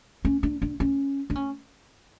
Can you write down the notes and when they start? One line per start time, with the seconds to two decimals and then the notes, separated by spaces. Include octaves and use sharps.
0.25 C#4
0.43 D4
0.62 D4
0.80 C#4
1.30 D4
1.35 C#4